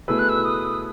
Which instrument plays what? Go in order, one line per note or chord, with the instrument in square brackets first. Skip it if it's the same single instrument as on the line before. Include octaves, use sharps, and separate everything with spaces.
[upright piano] B2 A3 E4 G#4 B4 [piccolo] E6
[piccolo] F#6
E6
D#6